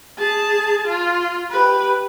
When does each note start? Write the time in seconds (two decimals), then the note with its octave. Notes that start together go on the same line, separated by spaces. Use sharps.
0.18 G#4 A5
0.87 F4
1.51 G4 B4